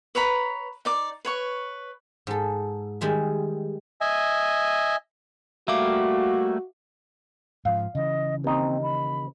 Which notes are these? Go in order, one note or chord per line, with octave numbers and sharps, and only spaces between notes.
B4 C#5 A#5 B5
D#4 D5 D6
B4 C#5 C#6
G#2 A4
D#3 G3 G#3 E5
D#5 E5 G#5
G3 A3 A#3 F#4 E5 F5 D6
G#2 F3 F5
C#3 E3 D#5
D#2 C4 D#4
B5